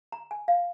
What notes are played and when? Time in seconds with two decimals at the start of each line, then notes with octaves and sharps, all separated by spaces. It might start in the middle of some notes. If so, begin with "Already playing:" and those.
0.12 A#5
0.31 G#5
0.48 F5